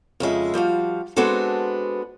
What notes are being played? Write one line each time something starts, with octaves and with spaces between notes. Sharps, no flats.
F2 C#3 G#3 E5
F3 G3 F#4 F5
G#3 B3 C4 D4 F#4 A4